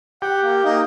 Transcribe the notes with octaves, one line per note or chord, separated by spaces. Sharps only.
G4 F#5
A#3
A#3 D#4